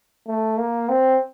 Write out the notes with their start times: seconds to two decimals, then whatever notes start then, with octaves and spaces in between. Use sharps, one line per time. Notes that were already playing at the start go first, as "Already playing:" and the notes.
0.27 A3
0.58 A#3
0.89 C4